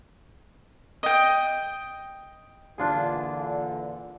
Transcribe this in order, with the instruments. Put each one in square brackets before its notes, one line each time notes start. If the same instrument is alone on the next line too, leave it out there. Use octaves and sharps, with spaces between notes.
[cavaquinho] D#5 G5
[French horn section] A#2 D3 E3 [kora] D4 F4 G#4